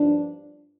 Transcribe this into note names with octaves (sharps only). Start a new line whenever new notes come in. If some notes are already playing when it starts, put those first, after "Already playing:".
Already playing: G2 F3 D4